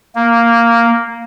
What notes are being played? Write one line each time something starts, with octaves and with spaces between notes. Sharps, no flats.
A#3